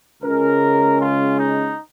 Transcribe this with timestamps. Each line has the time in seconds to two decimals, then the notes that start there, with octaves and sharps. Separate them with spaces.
0.22 C#2 C#3 G#3 C#4 A#4
1.00 F4
1.38 D#4